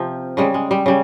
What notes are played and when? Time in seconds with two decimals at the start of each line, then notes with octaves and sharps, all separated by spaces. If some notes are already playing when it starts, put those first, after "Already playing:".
Already playing: C3 F3
0.37 C#3 G3 G#3
0.54 G#3
0.71 G3
0.86 C#3 G3